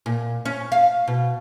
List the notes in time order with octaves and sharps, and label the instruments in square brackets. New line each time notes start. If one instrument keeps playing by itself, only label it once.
[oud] A#2
C#4
F5
B2